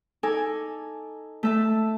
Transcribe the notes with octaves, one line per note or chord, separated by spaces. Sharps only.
D#4 A4 G#5 D6
A3 E5 A5